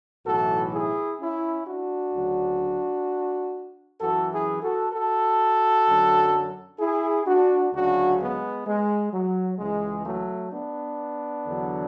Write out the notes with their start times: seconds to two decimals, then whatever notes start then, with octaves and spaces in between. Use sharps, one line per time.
0.25 B1 A2 E3 F#4 A4
0.72 E4 G#4
1.19 C#4 E4
1.65 D4 F#4
2.12 D2 C#3 F#3
3.98 F#2 E3 F#4 A4
4.30 E4 G#4
4.61 F#4 A4
4.92 F#4 A4
5.86 F#2 D3 F#3
6.78 E4 G#4
7.25 D4 F#4
7.72 D2 C#3 F#3 D4 F#4
8.18 G#3 B3
8.66 G#3
9.12 F#3
9.58 C#2 C#3 E3 G#3
10.06 F#3 A3
10.52 B3 D4
11.45 E2 D3 F#3